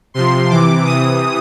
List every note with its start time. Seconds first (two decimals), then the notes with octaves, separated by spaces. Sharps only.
0.14 C3 F3 C6
0.49 C3 E3 D6
0.84 C3 E3 D#6